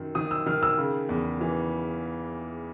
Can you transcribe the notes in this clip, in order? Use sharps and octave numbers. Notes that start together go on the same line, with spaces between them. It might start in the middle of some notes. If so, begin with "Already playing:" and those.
Already playing: F#2 D#3
D#3 D#6
E6
D#3 F6
E6
C#3
E2
E3